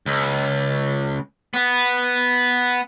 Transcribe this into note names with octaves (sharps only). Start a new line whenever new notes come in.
C#2
B3